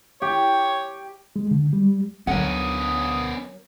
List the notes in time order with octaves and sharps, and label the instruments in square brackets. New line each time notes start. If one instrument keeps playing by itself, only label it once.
[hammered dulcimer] G4 [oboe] C#5
[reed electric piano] G#3
D3
G3
[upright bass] D2 D3 [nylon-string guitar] F#3 A#4 F#5 [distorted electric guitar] B3 C#4 [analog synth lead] D#6